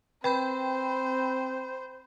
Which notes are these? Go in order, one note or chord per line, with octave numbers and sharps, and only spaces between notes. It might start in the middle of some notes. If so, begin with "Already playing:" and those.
C4 B4 C5 G5 B5 G6